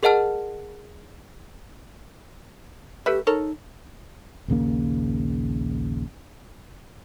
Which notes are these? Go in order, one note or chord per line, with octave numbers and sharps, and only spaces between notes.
G#4 A#4 D#5 F#5 A5 F6
A3 G4 B4 E5
D#4 A4 A#4 C#5
A#1 D#2 C#3 A#3